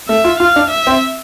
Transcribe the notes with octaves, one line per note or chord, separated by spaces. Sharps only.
A3 E5
F4
F4 F5
D4
E5
C4